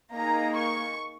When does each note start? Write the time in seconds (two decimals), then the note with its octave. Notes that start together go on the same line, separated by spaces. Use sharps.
0.12 A#3 D#4 G#4 A#5
0.56 C#6